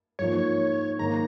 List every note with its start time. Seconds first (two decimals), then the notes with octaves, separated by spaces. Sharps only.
0.19 G#2 F3 A#3 C#5
0.99 G#2 D#3 A#3 A#5